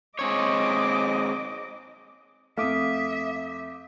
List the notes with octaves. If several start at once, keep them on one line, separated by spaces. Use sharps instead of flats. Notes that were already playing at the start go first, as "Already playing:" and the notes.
G#3 C4 C#5 D#5 D6
F2 A3 E5 F5 D6 D#6